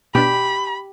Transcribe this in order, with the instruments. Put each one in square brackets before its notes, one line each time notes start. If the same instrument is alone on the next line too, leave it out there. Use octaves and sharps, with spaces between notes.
[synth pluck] B2 D4 [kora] G4 [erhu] B5